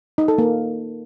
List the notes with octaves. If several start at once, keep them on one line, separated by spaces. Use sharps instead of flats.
D#4
A4
A#3